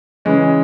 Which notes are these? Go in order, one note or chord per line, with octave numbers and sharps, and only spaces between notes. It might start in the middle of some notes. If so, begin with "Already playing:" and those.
C#3 E3 G#3 C#4